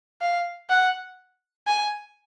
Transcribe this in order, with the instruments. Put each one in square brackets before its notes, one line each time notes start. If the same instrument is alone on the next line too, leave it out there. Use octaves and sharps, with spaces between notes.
[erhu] F5
F#5
G#5